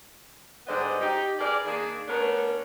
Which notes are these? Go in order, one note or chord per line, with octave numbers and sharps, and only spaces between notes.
G#2 D3 G3 B3 C5 D#5
D#4 G4
G#4 A#4 B4 D5
D#3 A#3 D4 G#4
A3 B3 C#4 D4 A#4